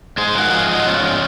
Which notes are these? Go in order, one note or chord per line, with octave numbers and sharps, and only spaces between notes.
G#2 G#4 C5
F3 F#4 A#4
G#2 F4 G#4
F3 D#4 F#4
G#2 C#4 F4
F3